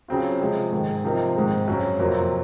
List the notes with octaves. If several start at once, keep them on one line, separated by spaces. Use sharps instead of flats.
C#3 F#3 C4 F4
C3 F3 G#3
G#2 D#3 G#3
C3 F3 C4 D#4 A#4
G#2 D#3 G#3 C4
F#2 C#3 F#3 C4
F2 C3 F#3 A#3